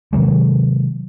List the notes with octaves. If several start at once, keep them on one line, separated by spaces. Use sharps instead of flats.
C3 D#3 F#3 G#3